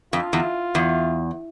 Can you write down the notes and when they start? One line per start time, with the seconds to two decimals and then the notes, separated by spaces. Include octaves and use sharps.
0.13 F2 F4
0.33 E2
0.75 E2